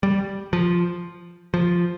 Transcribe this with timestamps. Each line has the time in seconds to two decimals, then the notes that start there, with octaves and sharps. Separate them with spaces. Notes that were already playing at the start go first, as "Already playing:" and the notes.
0.03 G3
0.53 F3
1.54 F3